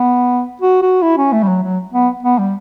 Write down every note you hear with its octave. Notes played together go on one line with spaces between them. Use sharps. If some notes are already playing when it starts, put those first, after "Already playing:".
Already playing: B3
F#4
F#4
E4
C#4
A3
G3
F#3
F#3
B3
B3
G3